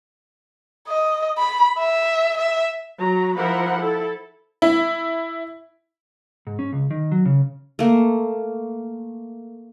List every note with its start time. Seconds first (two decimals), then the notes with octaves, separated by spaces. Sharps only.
0.88 D#5
1.38 B5
1.79 E5
2.37 E5
2.98 F#3 A#5
3.37 F3 E4 A#4 C5 F#5 B5
3.81 E4 A4
4.62 E4
6.47 G#2
6.59 C#4
6.73 C#2
6.91 D#3
7.12 F#3
7.25 C#3
7.79 A3 A#3